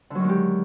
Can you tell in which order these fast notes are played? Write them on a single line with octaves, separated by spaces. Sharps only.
D3 F#3 D#3 G#3 G4